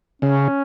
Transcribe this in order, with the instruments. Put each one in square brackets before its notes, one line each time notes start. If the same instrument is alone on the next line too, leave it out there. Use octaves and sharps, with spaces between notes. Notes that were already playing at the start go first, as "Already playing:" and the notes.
[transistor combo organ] C#3 [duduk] C#4